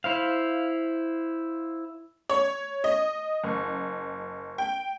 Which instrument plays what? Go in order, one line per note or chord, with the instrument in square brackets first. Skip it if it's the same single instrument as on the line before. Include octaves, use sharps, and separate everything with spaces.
[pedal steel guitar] E4 C5 F5
[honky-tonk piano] C#5
D#5
F#1
G5